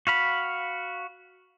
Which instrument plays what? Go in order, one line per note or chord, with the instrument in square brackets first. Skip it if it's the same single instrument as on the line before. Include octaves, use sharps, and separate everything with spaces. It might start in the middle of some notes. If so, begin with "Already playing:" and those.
[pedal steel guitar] F#4 F5 B5